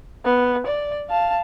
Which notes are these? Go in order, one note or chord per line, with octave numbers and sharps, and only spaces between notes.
B3
D5
F5 A5